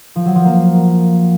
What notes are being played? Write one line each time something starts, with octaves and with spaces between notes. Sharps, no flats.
F3
F#3
F3
A#3